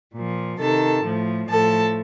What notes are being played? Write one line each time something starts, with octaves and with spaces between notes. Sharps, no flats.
A#2 F3
C3 D#3 A4 A5
A2 F3
A2 F3 A4 A5